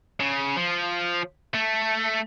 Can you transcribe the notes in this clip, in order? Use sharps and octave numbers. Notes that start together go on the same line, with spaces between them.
C#3
F3
A3